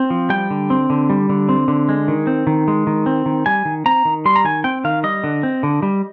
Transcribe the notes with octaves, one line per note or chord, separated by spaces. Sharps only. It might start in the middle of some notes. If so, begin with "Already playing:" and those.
Already playing: C4
F3
G3 G5
D3
C4
D3
G3
D3
C4
D3
G#3
D#3
C4
D#3
G#3
D#3
C4
D#3
G3 G#5
D#3
C4 A#5
D#3
G3 C6
A#5
D#3 G#5
C4 G5
D#3 F5
G3 D#5
D3
C4
D3
G3